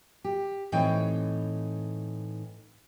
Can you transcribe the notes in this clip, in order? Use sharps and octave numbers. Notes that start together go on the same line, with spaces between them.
G4
A2 E3 C4 D#4 C#5 G5